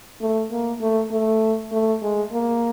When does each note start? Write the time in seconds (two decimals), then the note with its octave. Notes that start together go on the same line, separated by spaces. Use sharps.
0.21 A3
0.52 A#3
0.81 A3
1.11 A3
1.72 A3
2.02 G#3
2.32 A#3